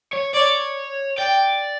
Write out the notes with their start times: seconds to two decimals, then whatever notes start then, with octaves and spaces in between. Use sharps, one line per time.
0.13 C#5
0.33 C#5 D5
1.17 D5 G5